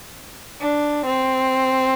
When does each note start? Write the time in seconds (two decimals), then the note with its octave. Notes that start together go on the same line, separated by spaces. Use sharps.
0.61 D4
1.04 C4